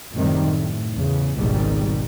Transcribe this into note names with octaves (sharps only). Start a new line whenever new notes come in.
F#2 A2 C3 D#3 G3
A2
E2 C#3
G#1 C#2 G#2 B2 D#3 G3